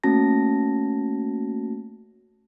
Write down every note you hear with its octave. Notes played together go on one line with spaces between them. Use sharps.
A3 A#3 C#4 F#4 A5 A#6